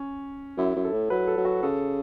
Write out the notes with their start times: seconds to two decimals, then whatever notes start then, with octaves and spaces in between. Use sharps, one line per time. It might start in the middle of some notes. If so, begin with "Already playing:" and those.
Already playing: C#4
0.57 F#2 E4
0.76 F#2
0.84 A4
0.93 A2
1.10 F#3 B4
1.27 A4
1.37 F#3
1.45 F#4
1.62 C#3 A4